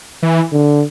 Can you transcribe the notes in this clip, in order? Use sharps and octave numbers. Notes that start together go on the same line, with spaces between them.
E3
D3